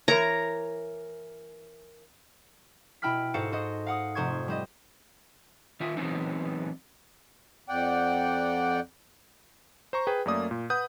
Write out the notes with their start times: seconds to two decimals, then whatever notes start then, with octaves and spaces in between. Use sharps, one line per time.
0.08 E3 A#4 C#5 A#5
3.02 B2 E4 G5 B5 F6 B6
3.34 G#2 F#4 A4 C5 F5 C#7
3.52 F#4 C5 D#5
3.86 F5 F#5 D#6
4.15 F1 C5 C#6 G#6
4.48 G3 C5 D#5
5.80 D#3 F4 E5
5.97 E3 F#3 G#3 B3 C4 D#4
7.69 F2 D5 F#5 G5
9.93 C5 A#5 C#6
10.07 G#4 B4 G5
10.26 F#2 A3 A#3 D5 D#6
10.51 A#2
10.70 B4 F#5 D#6 G6